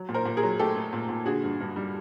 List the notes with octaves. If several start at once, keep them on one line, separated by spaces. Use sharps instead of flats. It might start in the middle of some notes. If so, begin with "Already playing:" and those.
Already playing: F#3
A#2
A#4 C5
A#2
G#4 A#4
F#3
A3 G4 A4
A3
A#2
A#2
D3 F#4 G#4
G2
G2
G3